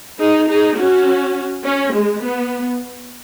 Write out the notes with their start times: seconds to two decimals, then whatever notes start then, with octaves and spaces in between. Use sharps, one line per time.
0.20 D#4 G#4
0.49 D#4 G#4
0.77 C#4 F#4
1.64 C#4
1.93 G#3
2.22 B3